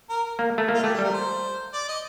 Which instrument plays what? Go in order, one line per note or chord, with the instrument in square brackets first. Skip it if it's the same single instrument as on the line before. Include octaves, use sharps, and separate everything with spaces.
[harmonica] A#4
A#4
[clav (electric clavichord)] A#3
A3
A#3
[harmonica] F4
[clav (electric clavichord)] A3 [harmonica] G4
[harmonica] A4
[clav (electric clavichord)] G3
[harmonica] A#4
C5
D5
D#5